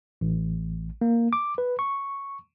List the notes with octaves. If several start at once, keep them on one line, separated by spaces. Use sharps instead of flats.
A1
A#3
D6
B4
C#6